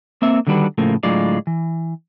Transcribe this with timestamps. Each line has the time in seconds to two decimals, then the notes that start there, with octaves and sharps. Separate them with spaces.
0.22 A#3 C4 E5
0.47 D3 D#3 G3 D4 F#4 B4
0.78 A2 C#3 F3 A3 A#3
1.03 A2 D3 F#3 G#3 F4 D5
1.47 E3